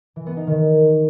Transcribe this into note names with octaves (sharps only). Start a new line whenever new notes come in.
E3
B3
D#4
D#3